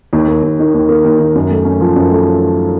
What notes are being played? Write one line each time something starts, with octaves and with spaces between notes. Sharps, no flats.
D#2
A#3
D#2
D#3
D#2
A#3
D#2
D#3
F#2
A3
C#4
F3
F#2
A3